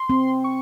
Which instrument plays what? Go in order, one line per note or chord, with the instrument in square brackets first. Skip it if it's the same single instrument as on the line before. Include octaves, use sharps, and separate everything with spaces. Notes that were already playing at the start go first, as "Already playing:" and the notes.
Already playing: [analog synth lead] C6
[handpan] C4
[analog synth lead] C#6